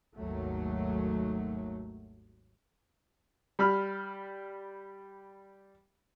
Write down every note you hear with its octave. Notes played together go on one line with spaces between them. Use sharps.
G#1 D#2 F#3 A3
G3 B5 F6